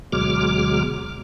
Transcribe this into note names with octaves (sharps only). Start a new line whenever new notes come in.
D2 B2 F#3 G#3 D6 F6